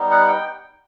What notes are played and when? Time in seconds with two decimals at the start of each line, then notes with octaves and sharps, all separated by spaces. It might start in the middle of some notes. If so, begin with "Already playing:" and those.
Already playing: G3 B3 D#4
0.11 F#5
0.28 G5